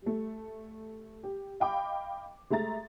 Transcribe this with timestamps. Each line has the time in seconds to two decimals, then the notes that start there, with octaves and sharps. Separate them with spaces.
0.02 G3 A3
1.23 G4
1.60 D#5 F5 G5 B5 D6
2.50 G#3 A3 E5 A#5 A6